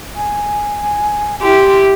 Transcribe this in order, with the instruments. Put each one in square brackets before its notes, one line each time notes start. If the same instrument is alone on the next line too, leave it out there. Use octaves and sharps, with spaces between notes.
[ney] G#5
[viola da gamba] E4 G4 [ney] C6